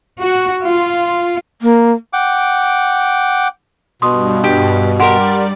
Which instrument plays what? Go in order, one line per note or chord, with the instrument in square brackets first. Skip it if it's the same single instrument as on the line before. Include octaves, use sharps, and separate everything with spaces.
[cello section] F#4
F4
[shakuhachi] A#3
[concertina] F#5 G5 D6
[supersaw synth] G2 [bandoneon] B2 [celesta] C6 D#6
[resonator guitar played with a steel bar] G4
[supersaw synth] G3 D5 [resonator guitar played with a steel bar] G4 A#4 [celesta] F#5 C6